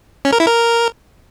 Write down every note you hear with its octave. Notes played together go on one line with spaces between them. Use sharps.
C#4
A#4
E4
A#4